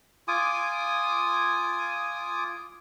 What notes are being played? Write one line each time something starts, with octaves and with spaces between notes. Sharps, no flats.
F4 G#5 D6 D#6